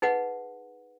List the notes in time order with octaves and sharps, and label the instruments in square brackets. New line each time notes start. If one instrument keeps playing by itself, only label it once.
[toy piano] D#4 G#4 B4 F#5